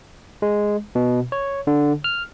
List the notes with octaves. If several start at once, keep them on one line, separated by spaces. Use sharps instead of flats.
G#3
B2
C#5
D3
F6